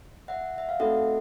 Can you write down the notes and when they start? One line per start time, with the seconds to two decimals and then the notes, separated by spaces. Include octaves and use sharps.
0.28 E5 F#5
0.58 E5
0.69 F5
0.79 A3 C4 D#4 F#4 A4 E5 F#5